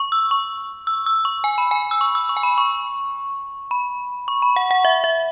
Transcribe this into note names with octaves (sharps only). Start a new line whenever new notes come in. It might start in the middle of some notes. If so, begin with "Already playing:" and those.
Already playing: C#6
E6
C#6
E6
E6
C#6
G#5
B5
G#5
E6
C#6
E6
C#6
G#5
B5
C#6
B5
C#6
B5
F#5
F#5
E5
E5